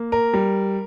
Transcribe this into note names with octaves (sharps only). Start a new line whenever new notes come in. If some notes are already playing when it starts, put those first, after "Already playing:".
Already playing: A#3
A#4
G3